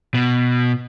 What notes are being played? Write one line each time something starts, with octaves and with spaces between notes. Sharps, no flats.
B2